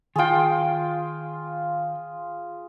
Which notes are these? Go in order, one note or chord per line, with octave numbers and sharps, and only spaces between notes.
D#3 F4 G#4 G5